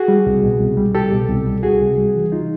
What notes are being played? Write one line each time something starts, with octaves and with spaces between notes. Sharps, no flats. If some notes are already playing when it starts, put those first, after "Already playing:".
Already playing: F#4 G#4
G3
C2
B2
C2
G3
C2 G4 A4
B2
C2
G3
C#2 F#4 G#4
C3
G3
E3
D#4 F4